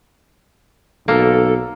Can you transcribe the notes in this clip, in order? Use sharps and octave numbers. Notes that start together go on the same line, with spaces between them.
B1 A#3 A4